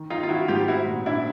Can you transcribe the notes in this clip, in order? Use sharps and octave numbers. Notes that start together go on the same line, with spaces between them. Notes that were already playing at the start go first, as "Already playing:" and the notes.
Already playing: D#3
D#3 D#4 F4
F4
D#3 E4 F#4
G#2 F4 G4
C4 E4 F#4
A#2
A#2 D4 E4